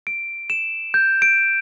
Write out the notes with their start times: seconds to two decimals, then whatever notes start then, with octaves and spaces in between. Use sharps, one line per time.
0.07 D7
0.50 E7
0.94 G6
1.22 D7